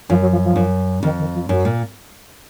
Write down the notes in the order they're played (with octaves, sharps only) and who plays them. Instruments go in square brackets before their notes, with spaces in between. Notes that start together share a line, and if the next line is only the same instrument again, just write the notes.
[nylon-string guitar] F#2 [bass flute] F3
[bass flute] F#3
F3
F3
[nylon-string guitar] F#2
[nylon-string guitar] F2 [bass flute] D#3
[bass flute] D#3
F3
[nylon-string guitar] F#2 [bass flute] F#3
[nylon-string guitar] A#2